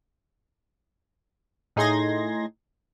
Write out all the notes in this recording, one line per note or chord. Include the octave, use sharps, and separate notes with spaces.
A2 D#4 G#4 C6 G#6 A#6